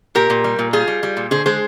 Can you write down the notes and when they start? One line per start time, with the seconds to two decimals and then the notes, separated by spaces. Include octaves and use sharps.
0.15 A#2 G4 A#4
0.30 A#2
0.44 G3
0.59 A#2
0.73 G3 F4 G#4
0.88 G3
1.03 G3
1.17 A#2
1.31 D3 G#4 C5
1.46 G#3 G#4 C5